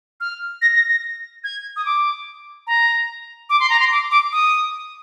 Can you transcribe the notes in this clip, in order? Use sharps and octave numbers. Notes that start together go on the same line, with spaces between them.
F6
A#6
A#6
A#6
G#6
D#6
D6
A#5
D6
C6
A#5
C6
D6
D6
D#6